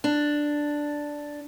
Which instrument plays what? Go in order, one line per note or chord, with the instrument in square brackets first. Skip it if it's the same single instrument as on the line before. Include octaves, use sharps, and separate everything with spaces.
[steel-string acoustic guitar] D4